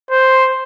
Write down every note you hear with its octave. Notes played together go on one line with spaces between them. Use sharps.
C5